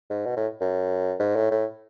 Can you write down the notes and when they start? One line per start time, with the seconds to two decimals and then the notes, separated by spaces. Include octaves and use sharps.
0.10 G#2
0.26 B2
0.36 A2
0.61 F#2
1.19 G#2
1.36 A2
1.51 A2